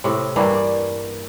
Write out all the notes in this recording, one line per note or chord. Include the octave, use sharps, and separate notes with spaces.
A2 C3
G2 E3 G3 A#3
D5